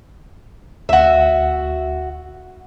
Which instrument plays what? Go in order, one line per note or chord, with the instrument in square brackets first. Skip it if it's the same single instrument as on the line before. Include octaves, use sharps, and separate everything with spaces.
[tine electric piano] D2 [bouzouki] F#4 E5